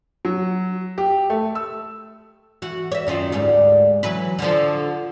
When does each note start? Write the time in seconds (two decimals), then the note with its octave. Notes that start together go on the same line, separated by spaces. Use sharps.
0.25 F#3
0.98 G4
1.30 A3
1.55 E6
2.62 E3 F#4
2.92 C#5 E5
3.07 F#2 D#3 F4
3.32 D2 G#2 G3
4.03 E3 F#3 B4
4.39 D3 F3